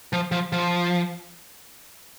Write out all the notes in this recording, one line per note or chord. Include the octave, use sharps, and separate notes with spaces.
F3
F3
F3